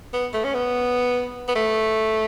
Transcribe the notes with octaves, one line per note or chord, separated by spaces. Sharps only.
B3
A3
C#4
B3
B3
A3